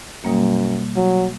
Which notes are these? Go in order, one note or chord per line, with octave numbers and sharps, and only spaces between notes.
F#2 B2 G3 A#3
F#3